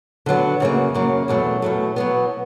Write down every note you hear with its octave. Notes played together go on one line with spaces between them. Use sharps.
D3 F#3 B3
F#2 C#3 F#3 A#3
F#2 C#3 F#3 A#3
E2 B2 F#3 A3
E2 B2 F#3 A3
B2 F#3 B3